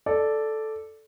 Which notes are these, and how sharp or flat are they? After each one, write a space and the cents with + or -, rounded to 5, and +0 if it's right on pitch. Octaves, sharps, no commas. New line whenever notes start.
A4 -5 D5 +0